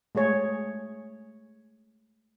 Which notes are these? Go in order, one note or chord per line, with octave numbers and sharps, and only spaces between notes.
G#3 A3 G#4 C#5